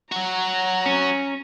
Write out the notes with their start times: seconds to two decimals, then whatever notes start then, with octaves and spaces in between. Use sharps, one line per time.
0.12 F#3 F#4 A#5
0.86 C#4